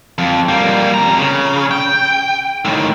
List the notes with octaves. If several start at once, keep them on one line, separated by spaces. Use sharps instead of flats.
F2
G3 A#3
F2 A#5
C#3
G5
A2 D#3